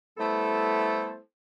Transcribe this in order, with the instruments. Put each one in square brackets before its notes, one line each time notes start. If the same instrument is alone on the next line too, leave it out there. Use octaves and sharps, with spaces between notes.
[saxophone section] G3 A3 B3 E4 A4 C5